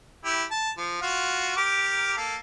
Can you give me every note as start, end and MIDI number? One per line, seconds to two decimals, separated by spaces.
0.25 0.43 64
0.25 0.43 67
0.51 0.70 81
0.77 0.97 53
1.01 1.55 65
1.01 1.55 66
1.57 2.17 67
1.57 2.17 70
1.57 2.17 86
2.17 2.36 58
2.17 2.36 69